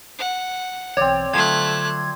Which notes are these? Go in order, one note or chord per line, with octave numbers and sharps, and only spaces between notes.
F#5
B1 E3 C4 C#5 D5
D3 F3 F#3 A3 C6 F#6 G#6